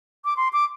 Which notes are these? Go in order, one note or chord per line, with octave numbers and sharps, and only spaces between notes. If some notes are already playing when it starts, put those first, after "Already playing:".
D6
C6
D6